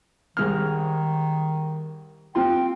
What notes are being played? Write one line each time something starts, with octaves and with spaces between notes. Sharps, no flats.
C2 D#3 G#3 F6
C4 F4 G5 C6